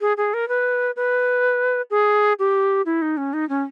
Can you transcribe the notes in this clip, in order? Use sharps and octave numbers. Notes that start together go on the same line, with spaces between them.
G#4
G#4
A#4
B4
B4
G#4
G4
E4
D#4
C#4
D#4
C#4